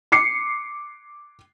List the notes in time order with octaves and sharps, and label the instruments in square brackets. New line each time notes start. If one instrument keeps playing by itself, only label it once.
[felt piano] D6 C7 C#7